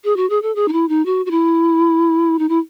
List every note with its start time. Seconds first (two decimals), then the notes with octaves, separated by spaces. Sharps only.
0.04 G#4
0.16 F#4
0.30 G#4
0.42 A4
0.55 G#4
0.68 D#4
0.72 E4
0.89 D#4
1.05 F#4
1.26 F#4
1.31 E4
2.39 D#4
2.49 E4